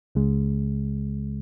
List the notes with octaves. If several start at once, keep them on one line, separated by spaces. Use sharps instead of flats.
C#2 C#3 G#3